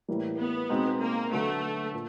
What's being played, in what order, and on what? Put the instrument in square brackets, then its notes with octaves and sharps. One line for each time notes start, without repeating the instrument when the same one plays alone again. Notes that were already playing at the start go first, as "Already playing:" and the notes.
[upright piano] A2 E3 G3 A#3
[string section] B3
[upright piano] B2 G#3 C4 D#4
[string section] A#3
[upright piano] D3 F#3 B3 [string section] A3
[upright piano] A#2